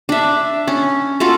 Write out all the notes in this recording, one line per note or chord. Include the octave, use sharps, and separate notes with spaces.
D4 E5
C#4
F4 F#4 A4